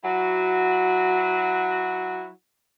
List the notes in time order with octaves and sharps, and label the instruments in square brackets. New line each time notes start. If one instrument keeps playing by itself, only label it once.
[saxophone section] F#3 E4 F#4